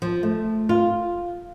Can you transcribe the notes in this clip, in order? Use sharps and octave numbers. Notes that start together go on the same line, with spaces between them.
F3
A3
F4